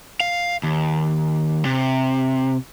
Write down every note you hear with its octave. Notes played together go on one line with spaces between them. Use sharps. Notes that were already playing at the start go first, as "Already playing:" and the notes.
F5
D#2
C3